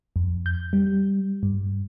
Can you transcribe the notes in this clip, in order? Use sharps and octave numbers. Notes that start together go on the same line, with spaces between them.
F2
G6
G3
G2